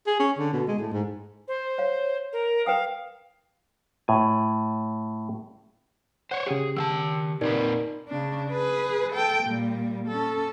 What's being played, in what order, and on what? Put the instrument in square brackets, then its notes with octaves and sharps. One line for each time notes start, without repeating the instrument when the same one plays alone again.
[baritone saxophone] G#4
C#4
D3
B2
G#3
A2
G#2
[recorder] C5
[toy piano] C#5 F5
[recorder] A#4
[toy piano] B4 G5 D#6 [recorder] F5
[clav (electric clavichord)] A2 G#5
[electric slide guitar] C5 C#5 [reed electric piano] F#5
[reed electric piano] C#3 G4 [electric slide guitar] G#4
[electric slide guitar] D#3 F#5 A5 [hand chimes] E6
[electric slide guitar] A#2 C4 B4 [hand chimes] D#4 A#4 D5
[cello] C#3 D4
G#4 B4
A4 G5
A#2 G3
C#4 A4